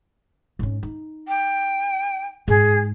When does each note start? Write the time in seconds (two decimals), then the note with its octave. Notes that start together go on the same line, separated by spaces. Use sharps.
0.59 G#2 C#4
0.83 D#4
1.28 G5
2.48 G#2 G#4